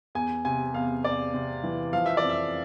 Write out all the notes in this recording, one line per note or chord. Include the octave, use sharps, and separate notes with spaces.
E2 G#5
C3 G#5
E2 F5
E2 D5
C3
E3
F3 F5
E5
D5
F2
E5